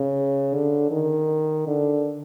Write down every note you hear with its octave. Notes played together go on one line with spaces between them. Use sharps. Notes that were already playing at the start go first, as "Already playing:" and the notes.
Already playing: C#3
D3
D#3
D3